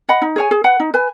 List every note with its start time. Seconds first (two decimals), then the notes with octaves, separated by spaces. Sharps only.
0.09 D#5 F#5 B5
0.22 D#4
0.36 G#4 C#5 G#5
0.51 G#4
0.64 B4 F#5
0.80 D#4
0.94 B4 G#5